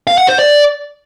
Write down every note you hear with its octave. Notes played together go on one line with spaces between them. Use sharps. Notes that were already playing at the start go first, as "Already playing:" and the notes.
F5
F#5
C5
D5